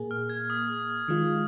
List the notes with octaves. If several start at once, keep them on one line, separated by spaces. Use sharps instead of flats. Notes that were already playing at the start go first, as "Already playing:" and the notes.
Already playing: A#2 A#3 G#4
F6
G#6
D#6
D#3 G#3 F4